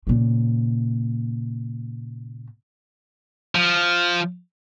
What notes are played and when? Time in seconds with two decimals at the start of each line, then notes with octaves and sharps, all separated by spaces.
0.07 A#2 C#3
3.55 F3